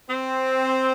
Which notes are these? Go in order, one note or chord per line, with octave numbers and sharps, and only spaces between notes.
C4